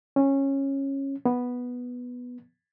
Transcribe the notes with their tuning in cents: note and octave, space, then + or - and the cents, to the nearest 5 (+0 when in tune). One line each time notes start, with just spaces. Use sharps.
C#4 -15
B3 -5